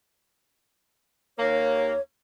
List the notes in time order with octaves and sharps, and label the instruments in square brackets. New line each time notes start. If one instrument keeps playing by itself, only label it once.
[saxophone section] D#2 A#3 [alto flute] C#5